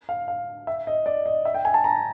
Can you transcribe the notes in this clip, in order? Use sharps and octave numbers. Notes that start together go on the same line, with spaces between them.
F5
F5
E5
D#5
D5
D#5
E5
G5
G#5
A5
A#5